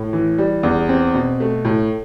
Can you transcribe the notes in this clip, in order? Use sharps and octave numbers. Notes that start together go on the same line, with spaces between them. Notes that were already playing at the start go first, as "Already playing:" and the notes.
Already playing: A2
E3
G3
E2
C4
B2
A3
A2